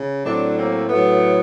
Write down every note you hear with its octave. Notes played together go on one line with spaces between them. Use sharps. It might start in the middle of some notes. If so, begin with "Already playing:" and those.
Already playing: C#3
A2 F#3 A3 C4 D4
A#3 C4
A2 F#3 A3 B3